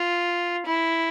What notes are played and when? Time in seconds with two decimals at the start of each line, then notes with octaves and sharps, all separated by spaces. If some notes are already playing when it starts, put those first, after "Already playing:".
Already playing: F4
0.66 E4